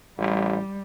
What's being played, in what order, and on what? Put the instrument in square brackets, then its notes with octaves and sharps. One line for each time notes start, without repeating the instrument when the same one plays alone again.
[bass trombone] A1 [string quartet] G3